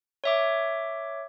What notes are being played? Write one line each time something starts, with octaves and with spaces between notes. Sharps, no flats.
C#5 E5 D6